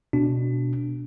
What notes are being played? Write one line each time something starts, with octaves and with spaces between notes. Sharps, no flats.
B2 D4